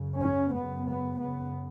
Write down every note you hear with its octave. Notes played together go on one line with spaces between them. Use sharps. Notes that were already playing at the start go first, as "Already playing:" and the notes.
Already playing: F#2 C#3
C#4
F#2 C#3 B3
B3
F#2 C#3 B3